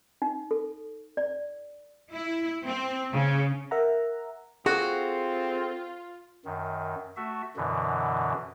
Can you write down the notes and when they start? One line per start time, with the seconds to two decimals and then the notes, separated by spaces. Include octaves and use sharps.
0.22 D#4
0.51 A4
1.17 D5
2.12 E4
2.64 C4
3.11 C#3
3.71 A#4 E5 F#5 A#5
4.66 C4 F4 F#4 G#4 A4
6.45 F#2 D#3
7.16 A3 F#4 E5
7.57 F#2 B2 D3 E3